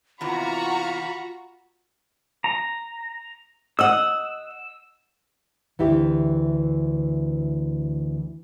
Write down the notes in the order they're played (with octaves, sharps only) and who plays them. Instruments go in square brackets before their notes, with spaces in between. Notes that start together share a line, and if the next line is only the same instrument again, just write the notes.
[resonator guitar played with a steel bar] E2 C3 E3 [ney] F4 [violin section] F#4 A#5 C#6 [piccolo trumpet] B5
[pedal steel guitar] A#5
[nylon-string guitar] D#5 F#5 [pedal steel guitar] E6
[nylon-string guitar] D2 E3 E4 G4